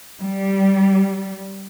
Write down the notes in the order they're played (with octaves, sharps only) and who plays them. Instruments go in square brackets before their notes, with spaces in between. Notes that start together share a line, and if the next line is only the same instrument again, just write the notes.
[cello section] G3